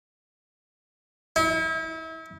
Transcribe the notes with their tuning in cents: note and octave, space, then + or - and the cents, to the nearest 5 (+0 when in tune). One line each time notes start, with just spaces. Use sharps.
E4 -35